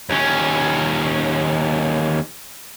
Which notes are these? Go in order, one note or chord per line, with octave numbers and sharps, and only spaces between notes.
D#2 C#4